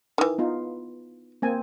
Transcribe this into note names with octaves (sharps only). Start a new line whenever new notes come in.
D#3 E3
B3 D#4 F4
A#3 C4 G#5